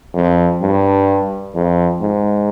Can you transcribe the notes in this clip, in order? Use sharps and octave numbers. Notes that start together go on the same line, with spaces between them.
F2
G2
F2
G#2